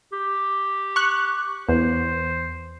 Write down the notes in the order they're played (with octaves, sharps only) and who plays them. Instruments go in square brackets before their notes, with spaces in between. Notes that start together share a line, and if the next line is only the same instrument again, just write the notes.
[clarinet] G4
[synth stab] C#6 F#6
[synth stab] E2 [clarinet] C5